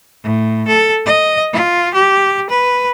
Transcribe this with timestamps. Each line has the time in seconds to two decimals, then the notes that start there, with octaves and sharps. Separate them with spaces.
0.23 A2
0.67 A4
1.06 D#5
1.53 F4
1.94 G4
2.50 B4